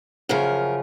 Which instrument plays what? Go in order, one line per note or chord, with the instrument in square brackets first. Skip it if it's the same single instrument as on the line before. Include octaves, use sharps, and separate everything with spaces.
[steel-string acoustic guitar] F#2 C#3 F3 A#4